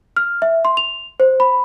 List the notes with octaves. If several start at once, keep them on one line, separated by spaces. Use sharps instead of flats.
F6
E5
C6
F7
C5
B5